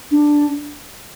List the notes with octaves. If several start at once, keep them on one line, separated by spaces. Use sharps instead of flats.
D4